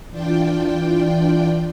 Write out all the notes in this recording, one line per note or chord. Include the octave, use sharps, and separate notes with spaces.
E3 D4 F4 D5 G5